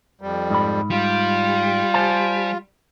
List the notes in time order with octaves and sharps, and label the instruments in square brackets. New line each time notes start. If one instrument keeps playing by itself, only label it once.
[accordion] F2 G3
[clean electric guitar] G#2 B5
[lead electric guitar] G3 [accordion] F4
[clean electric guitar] C5 G#5 A5